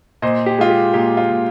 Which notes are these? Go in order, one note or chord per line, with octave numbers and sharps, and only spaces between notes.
A#2 C5 D#5
G4
G#3 F4
G4
A#2 G4
F4
A#2